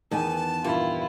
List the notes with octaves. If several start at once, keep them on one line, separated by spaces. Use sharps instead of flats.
E2 D#3 B3 G#5 A5
G2 A#2 G3 E4 F4